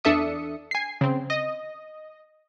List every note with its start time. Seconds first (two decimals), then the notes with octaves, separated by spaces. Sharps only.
0.04 E2 D4 A4 E5 D#6 C#7
0.71 G#5 C7
1.01 C#3 C4
1.30 D#5